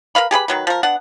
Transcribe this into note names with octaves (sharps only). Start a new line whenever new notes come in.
A#4 B4 F5 B5
G4 G#4 B4 B5
D#3 F#3 B4
F3 A#4
B3 D4 F#5